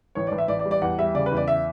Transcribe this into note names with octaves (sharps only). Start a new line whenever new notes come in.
A1 C#5
A1 D5
E5
A1 D5
D5
G3
D5
E2 F#5
G3 E5
C#3 D5
B4
E2
D5
E5